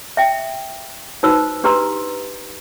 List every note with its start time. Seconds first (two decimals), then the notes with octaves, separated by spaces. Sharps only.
0.17 E5 G5
1.23 D#4 F#4 B4 C5 E6
1.64 D4 G4 B4 A#5 C6 E6